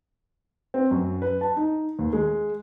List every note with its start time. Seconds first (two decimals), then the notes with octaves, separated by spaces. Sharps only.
0.74 C4
0.91 F#2
1.22 B4
1.41 A5
1.57 D#4
1.99 D#2
2.13 G#3